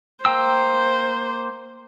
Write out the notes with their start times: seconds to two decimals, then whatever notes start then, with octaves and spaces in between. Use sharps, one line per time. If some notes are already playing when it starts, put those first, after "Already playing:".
0.25 A#3 C5 G5 E6